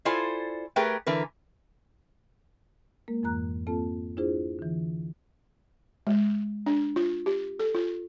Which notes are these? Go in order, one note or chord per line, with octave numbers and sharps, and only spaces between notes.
E4 F4 A4 C5 D5 G#5
A3 G4 G#4 A#4 B4 G5
D3 E3 A#4 B4
G#3 A#3 A#4
F2 G#2 E3 A#5 F#6
A#3 C4 F4 A4 A5
D4 E4 F4 G#4 C5
D3 E3
G#3
D4
F4
G4
A4
F4